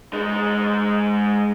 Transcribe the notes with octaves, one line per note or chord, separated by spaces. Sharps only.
G#3 D#4